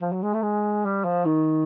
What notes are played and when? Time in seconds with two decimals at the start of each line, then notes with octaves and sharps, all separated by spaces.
0.01 F3
0.12 F#3
0.22 G#3
0.33 A3
0.43 G#3
0.85 G3
1.04 F3
1.25 D#3